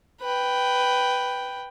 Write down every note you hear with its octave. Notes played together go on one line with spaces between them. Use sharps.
B4 G5